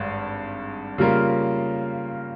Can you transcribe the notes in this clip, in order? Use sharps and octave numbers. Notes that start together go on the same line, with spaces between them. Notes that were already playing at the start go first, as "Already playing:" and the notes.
Already playing: G#1 G2 G#3
C#3 G3 A#3 F4 A#4